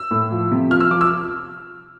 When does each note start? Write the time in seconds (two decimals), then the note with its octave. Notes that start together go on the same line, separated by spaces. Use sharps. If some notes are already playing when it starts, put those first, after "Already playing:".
Already playing: E6
0.11 A2
0.32 F3
0.52 C3
0.71 F3 F6
0.80 E6
0.90 F3 D6
1.01 E6